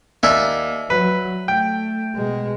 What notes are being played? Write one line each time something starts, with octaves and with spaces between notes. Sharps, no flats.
D#2 D5 E5 G#5
F#3 B4
A3 G5
B2 G#3